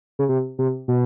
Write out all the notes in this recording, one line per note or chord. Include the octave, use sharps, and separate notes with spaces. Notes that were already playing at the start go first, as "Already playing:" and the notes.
C#3
C3
C3
B2